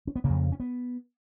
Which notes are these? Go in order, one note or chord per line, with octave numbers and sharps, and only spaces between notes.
C#4
B3
C#3 A#3
F2
C#4
B3